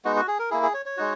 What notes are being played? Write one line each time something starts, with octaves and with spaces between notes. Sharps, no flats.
G#3 B3 D#4 F#4
F#4
G#4
A#4
A#3 E4 G#4
G#4
C#5
C#5
G#3 D#4 F#4